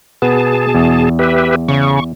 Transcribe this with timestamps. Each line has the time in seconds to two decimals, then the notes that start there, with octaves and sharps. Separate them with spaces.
0.22 B2 B3 G#4 A5
0.75 E2
1.19 G4 B4 E5
1.68 C#3 C#6